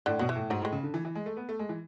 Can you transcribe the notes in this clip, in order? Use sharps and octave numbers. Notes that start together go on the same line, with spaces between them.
A2 D3
B2 F#3
E3
A2
G#2 F#3
A2 G#3
C#3
D3
E3
E3
G#3
A3
B3
A3
G#3
E3